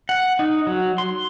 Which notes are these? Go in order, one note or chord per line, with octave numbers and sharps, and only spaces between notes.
F#5
D#4
F#3
C6